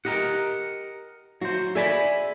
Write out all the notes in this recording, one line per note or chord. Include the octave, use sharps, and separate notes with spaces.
G4 A#4 D#5 F#5
F#3 F#4 C5
G#4 D5 E5 G#5 B5